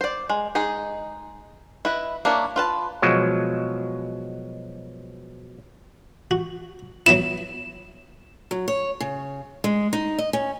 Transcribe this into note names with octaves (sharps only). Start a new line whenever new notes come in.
C5 D5
G#3
G#3 D#4 G#4
E4 B4 D#5
A#3 D4 E4 C#5
F4 B4 A5
B2 F3 F#3 G#3
F#4
F#3 B3 E4 E7
F#3
C#5
C#3
G#3
D#4
D#5
C#4